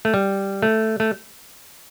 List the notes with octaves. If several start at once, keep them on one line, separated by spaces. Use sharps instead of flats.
A3
G3
A3
A3